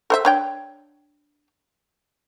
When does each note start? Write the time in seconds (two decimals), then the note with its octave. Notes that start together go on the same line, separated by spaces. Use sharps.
0.10 A4 C5 E5
0.25 D4 C#5 G5